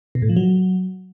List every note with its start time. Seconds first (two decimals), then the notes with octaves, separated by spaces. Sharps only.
0.15 B2
0.22 A2
0.29 F3
0.37 F#3